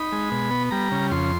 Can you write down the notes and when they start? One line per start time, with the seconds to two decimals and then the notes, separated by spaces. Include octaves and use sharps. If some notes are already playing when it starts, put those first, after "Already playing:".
Already playing: D#4 B5
0.12 G#3
0.32 B2
0.51 B3
0.71 G3 A#5
0.92 C#3
1.11 F2 C6